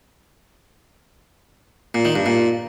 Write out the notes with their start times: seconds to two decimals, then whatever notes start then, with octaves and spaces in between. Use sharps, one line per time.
1.95 A#2
2.05 D#3
2.15 G2
2.26 A#2